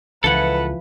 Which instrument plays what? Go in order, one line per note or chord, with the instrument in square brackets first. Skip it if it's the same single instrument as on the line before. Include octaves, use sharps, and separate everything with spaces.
[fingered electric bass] C#2 [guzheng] E3 F3 G#5 [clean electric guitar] A4 F#5 [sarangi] B4